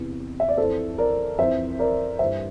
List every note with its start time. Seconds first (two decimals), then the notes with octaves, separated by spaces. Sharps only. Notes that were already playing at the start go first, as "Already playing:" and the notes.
Already playing: E2 C3 E3
0.40 E5
0.48 D5
0.57 F2 E3 A4 C5
0.98 A#4 D5
1.38 F2 E3 C5 E5
1.79 A#4 D5
2.19 G2 E3 C5 E5